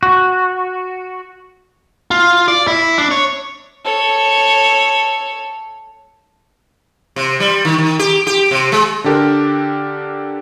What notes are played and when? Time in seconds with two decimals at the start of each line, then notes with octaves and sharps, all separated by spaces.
0.03 F#4
2.11 F4
2.48 D5
2.67 E4
2.98 D4
3.11 C#5
3.85 A4 C#5
7.16 C3
7.40 G3
7.65 D#3
7.78 D#3
7.99 G4
8.27 G4
8.51 C3
8.72 G#3
9.04 D3 D4 G4 A4 A#4